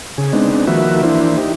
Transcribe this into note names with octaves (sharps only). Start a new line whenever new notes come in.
C#3 G#4
G#3 B3 C4 D4 D#4
D#3 F3 A#3 F#4 B4 E5
E3 A#3 D4 E4 C5
D#4 G4